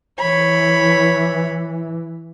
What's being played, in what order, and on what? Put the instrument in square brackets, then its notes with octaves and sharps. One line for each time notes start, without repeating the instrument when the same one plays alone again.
[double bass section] E3 [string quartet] C#5 B5